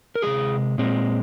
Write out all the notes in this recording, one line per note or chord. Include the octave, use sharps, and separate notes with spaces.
A#4
C3 F3 G#3 G#4
A#2 G#3 C4